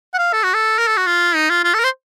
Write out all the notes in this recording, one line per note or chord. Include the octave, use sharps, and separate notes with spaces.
F#5
F5
A4
F#4
A4
A#4
A4
F#4
F4
D#4
F4
F4
A4
A#4
C5